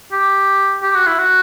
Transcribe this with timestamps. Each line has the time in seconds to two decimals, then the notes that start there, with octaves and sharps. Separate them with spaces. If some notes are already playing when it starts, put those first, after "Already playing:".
0.12 G4
0.83 G4
0.95 F#4
1.06 E4
1.18 F#4